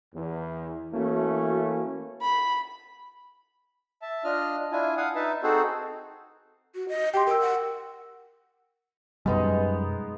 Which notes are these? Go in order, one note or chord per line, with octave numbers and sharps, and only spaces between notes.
E2
E3 A3 A#3 C#4 F#4
B5
E5 A5
D4 F4 D#5 F6
D4 E4 F4 G#5
F5 F#5 G#5 D#6
D#4 B4 E5 A5
C4 D#4 F#4 G#4 A4 C5
F#4
D#5
G4 G5 C6
A#4 G5 E6
F#5
F#2 B2 G3 G#3 B3 D#4